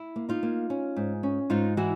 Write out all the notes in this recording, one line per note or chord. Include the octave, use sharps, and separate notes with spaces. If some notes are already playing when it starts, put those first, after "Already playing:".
Already playing: E4
A#3
D#4 F4
A#3
C#4
G#2
C#4
G#2 D#4 F4
E3 E4 F#4